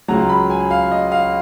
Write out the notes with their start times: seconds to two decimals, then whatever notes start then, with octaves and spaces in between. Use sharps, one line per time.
0.08 C#2 C#3 F#3 A#5
0.29 B5
0.50 G#5
0.71 F5
0.92 D#5
1.12 F5